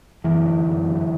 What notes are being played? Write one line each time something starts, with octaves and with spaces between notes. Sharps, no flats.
F#2 E3
D3
F#2
D3